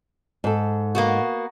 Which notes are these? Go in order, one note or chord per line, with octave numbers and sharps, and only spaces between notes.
G#2 A4
A#3 B3 F#4